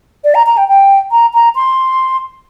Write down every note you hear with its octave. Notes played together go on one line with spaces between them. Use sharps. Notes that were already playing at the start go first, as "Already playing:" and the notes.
D5
A#5
A#5
G5
G5
A#5
A#5
C6